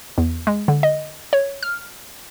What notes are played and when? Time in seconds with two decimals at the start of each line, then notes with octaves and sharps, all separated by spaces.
0.18 E2
0.47 G#3
0.68 D3
0.83 D#5
1.33 C#5
1.63 F6